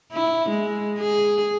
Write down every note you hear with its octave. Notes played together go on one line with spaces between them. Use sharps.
E4
G#3
G#4